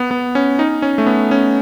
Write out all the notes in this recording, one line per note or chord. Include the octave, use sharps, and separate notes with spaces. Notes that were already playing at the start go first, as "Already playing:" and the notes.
Already playing: B3
B3
C#4
D#4
C#4
A3
B3
C#4